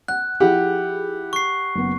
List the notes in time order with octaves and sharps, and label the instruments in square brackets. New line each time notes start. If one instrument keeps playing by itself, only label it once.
[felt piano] F#5 [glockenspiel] F#6
[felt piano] F3 E4 G#4 [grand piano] G4 F#5
[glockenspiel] C#6 C7
[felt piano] F#1 B3